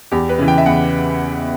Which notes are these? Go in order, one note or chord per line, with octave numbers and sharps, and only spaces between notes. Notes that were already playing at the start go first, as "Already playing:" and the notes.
E2 G4
B4
C#3 E3
G5
E5
E2 F#5